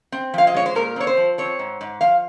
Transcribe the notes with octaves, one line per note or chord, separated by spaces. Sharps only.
C4
F3 F5
D#5
G#3 C#5
C5
A#2 A#4
C4 C#5
C5
F3
C4 C#5
G#2
G#2
F3 F5